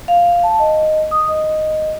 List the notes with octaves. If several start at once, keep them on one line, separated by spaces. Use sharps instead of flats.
F5
A5
D#5
D#6
D#5